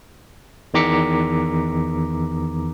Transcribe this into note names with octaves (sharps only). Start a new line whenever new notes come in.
E2 D#3 A#5 D6 B6 C#7